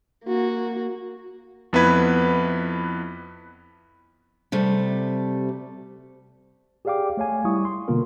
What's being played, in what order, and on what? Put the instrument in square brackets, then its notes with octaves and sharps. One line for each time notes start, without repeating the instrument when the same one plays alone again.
[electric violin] A#3 F#4
[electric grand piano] F2 B3 E4 B4 G#6
[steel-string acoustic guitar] C3 G3 A3
[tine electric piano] G4 G#4 D5 F5 G5 D6
A3 C#5 F5 G#5
G3 E4 C#6 D#6
C6
B2 D3 A#3 B3 F4 A#4